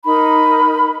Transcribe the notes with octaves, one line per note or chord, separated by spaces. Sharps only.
D#4 A#4 B5